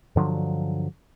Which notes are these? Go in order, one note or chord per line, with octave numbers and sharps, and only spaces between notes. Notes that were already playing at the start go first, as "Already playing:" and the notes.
G2 D3 F3 F#3